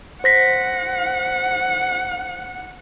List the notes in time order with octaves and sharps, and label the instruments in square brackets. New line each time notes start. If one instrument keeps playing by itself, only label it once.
[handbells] C5 A#6 B6 [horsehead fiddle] F#5